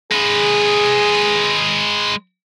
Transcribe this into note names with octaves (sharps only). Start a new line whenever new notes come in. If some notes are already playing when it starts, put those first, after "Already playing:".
G#3 G#4 B4